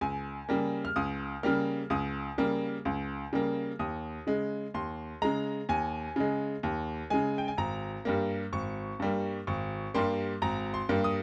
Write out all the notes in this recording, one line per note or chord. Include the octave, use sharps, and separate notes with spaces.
C#2 G#5
C#3 G3 A#3
F6
C#2 D#6
C#3 G3 A#3 F6
C#2 D#6
C#3 G3 A#3
C#2
C#3 G3 A#3
D#2 D#6
C#3 G#3
D#2 C6
C#3 G#3 A#5
D#2 G#5
C#3 G#3
D#2
C#3 G#3 G#5
G5
G#5
G#1 A#5
G2 G3 A#3
G#1 C#6
G2 G3 A#3
G#1 C#6
G2 G3 A#3 C6
G#1 A#5
C6
G2 G3 A#3
D#6